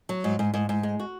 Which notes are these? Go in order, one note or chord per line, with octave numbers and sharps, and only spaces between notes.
F#3
G#2
G#2
G#2
G#2
G#3
F#4